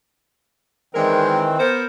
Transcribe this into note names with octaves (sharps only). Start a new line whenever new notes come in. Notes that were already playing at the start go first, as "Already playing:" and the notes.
D#3 E3 G#3 C4 D4 A#4
B3 A#4 C5